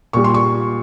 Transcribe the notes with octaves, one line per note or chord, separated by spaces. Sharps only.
A#2 G3 C#6
C6
C#6